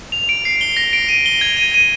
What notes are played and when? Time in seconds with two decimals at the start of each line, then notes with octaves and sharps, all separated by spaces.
0.12 F7
0.29 D7
0.45 C7
0.61 G7
0.77 A#6
0.93 D7
1.09 D#7
1.26 G7
1.41 G#6
1.57 D#7
1.74 D#7